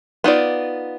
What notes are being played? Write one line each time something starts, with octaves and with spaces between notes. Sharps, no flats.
B3 D#4 F4 D5